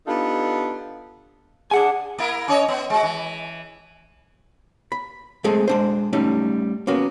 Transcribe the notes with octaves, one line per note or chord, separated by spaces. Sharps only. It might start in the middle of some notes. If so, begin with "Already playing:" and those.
B3 D4 D#4 F4 G4 A4
D4 G#4 F#5 G#5
A#3 E4 A#4
C#4 C#5 D#5
B3
G#3 F#4
E3
B5
G#3 A3 C4 G#4 A4
G#3 D4 C5
G3 A3 C#4 D#4
A#3 B3 C#4 F#4